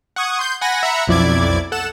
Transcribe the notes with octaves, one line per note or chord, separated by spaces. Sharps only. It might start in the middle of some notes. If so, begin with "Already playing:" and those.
F#5 C#6 D#6 G#6
C6 G6
F#5 G#5 B5 A#6
E5 F#5 A#5 B5 C#7
B1 F2 E4 D5 D6 G#6
A4 F#5 E7